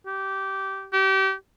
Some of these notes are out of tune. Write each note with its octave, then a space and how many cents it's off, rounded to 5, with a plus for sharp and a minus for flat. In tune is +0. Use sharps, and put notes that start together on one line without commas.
G4 -15
G4 -30